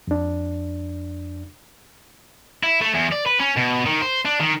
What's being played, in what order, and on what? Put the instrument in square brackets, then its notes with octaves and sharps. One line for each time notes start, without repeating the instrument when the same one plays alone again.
[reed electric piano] F2 D4
[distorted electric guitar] E4
A3
E2
D5
B4
C#4
B2
D#3
C5
D4
D#3